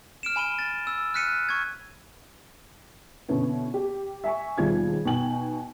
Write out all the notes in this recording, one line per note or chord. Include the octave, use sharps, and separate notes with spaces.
F6 D7 E7
G#5 B5 D#7 G7
A6
E6
F6 F#6 B6 C#7 D#7
C#6 G#6
B2 D3 B3 C#4 E4
G4
E5 G#5 C#6
D#2 B2 F3 G3 G#4 G#6
B2 D#4 G5 G#5 F#7